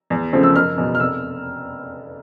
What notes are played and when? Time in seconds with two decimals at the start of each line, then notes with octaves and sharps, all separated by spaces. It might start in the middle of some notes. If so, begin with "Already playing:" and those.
0.10 E2
0.33 C#3 F3 A3 C4
0.43 E6
0.55 F#1 F6
0.78 E2 B2
0.95 F6
1.00 F1 E6